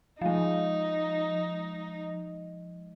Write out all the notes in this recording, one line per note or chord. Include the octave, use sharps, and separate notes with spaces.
F3 G#3 D#4